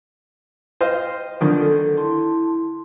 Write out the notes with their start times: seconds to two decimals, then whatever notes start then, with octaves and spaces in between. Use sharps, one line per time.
0.81 C5 D#5 F5 G5
1.40 D3 D#3 F3 D5
1.58 A4
1.97 E4 A5 C6